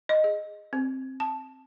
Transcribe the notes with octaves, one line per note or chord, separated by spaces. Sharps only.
D#5
G#4
C4
A5